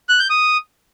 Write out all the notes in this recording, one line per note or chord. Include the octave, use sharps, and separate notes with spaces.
F#6
G6
D#6